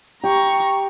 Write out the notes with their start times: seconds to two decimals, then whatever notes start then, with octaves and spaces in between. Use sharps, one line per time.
0.24 G4 A#5 C#6